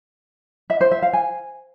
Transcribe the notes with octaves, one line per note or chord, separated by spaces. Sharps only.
E5
C5
E5
F5
G#5